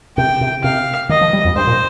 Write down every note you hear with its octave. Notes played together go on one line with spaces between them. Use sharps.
C3 G5
C3
C3 F5
D#3 D#5
F3
G3
F2
G2 C5
A#2